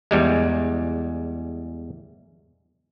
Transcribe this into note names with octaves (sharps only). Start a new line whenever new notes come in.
E2 G3 G#3